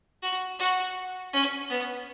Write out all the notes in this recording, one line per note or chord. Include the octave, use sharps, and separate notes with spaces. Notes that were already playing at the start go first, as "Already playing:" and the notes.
F#4
F#4
C#4
B3